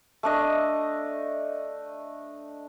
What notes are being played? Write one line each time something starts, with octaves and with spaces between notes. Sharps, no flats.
A3 D4 D#5